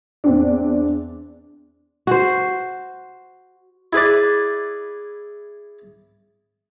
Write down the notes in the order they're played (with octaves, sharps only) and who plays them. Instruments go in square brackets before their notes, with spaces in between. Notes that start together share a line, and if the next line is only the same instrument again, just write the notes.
[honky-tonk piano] E2 C4 D4
[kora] F#4 C5
[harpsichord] E4 G#4 B4 D5